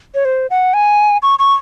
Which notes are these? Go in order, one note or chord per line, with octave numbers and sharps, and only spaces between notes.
C#5
C5
F#5
G#5
C#6
C#6